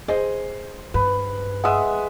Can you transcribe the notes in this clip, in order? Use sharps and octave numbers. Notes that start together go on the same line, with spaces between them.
G#4 C5 D#5
G2 B4
G#3 E5 F#5 D#6